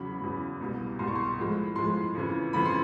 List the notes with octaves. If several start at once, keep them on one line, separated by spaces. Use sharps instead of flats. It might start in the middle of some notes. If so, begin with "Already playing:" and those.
Already playing: E2 C#3 F#3 B5
E2 C#3 F#3
C2 B2 G3
C2 B2 G3 C6
C#6
C6
A2 F3 G#3
A2 F3 G#3 C6
F2 C#3 E3
F2 C#3 E3 B5
C6